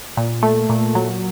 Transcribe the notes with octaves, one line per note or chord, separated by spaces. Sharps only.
A#2
A3
A#2
F#3